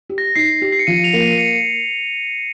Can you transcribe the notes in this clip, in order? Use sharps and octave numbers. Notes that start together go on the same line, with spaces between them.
G4
A#6
D#4 C7
G4
C7
C#7
F3 D#7
F7
A#3
D#7
C#7